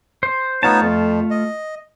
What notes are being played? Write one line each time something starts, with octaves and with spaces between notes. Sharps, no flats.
C5
A3 B3 D#4 F4 C#5 A5
F2
D#5